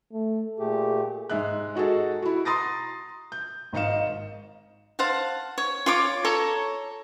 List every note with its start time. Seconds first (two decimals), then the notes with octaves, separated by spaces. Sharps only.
0.13 A3
0.59 A#2 A3 G4 G#4
1.30 G#2 G#3 E5 F#6
1.75 D#4 F#4 G#4 A4
2.22 E4 F#4
2.45 A#5 C6 D#6 A6 A#6
3.32 G6
3.73 G#1 G#2 D#5 F5 C#7 E7
4.99 C5 F5 F#5 A5
5.58 C#5
5.86 F4 C#5 D6
6.25 A4 C#5 A#5